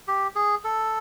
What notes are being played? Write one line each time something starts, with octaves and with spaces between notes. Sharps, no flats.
G4
G#4
A4